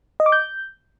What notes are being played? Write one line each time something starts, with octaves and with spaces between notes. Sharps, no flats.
D#5
D6
G6